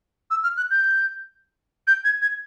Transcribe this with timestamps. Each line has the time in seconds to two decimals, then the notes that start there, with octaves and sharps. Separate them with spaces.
0.30 E6
0.43 F6
0.57 F#6
0.70 G6
1.87 G6
2.04 G#6
2.22 G#6